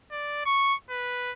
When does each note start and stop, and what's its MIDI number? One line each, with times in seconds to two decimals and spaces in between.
0.12 0.45 74
0.46 0.74 85
0.90 1.32 71